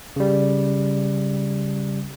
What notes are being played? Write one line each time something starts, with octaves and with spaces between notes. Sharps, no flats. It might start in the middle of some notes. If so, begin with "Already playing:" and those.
C#3 G3